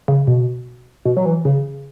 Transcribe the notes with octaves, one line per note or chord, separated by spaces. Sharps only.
C#3
B2
B2
F#3
E3
C#3